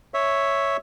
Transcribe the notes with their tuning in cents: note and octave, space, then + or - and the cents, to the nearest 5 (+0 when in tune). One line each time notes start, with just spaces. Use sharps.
C#5 +0 E5 +0